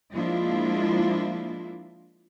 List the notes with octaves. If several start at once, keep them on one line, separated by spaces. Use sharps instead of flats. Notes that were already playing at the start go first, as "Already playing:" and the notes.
F3 G#3 A#3 D4 E4 F4